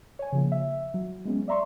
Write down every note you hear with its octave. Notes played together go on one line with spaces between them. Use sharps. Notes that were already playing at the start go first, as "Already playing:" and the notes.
C#5 G#5
C#3 F3 A#3
E5
F#3
G#3 B3 C#4
D5 E5 A#5 C6 C#6